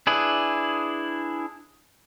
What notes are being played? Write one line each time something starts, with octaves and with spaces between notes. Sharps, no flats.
D4 E4 G#4 B4